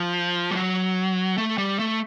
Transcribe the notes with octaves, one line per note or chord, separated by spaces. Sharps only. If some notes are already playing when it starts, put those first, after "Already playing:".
Already playing: F3
G3
F#3
A3
G3
A3